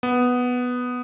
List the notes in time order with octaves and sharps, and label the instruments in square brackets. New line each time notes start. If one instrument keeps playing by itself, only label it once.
[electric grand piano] B3